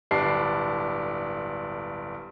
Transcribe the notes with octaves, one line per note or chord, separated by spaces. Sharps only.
D1 G1 G3 D4 C7